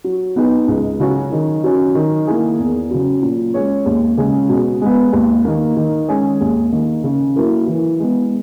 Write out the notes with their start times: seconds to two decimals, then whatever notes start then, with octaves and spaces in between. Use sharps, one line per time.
0.04 F#3
0.36 B3 D#4 G#4
0.68 C#2
1.00 C#3 F#3 C#4 F#4
1.32 D#3
1.64 F#3 C#4
1.95 D#3
2.27 A#3 E4 G#4
2.59 E2
2.90 C#3 F#3
3.22 A#2
3.54 G#3 C#4 G#4 C#5
3.86 D#2
4.17 C#3 G#3 C#4 G#4
4.49 B2
4.81 G#3 B3
5.13 D#2
5.45 D#3 A#3
5.77 D#3
6.08 G#3 C#4 G#4
6.40 D#2
6.72 D#3 A#3
7.04 C#3
7.36 F#3 A#3 E4 A#4
7.67 E3
7.99 G#3 B3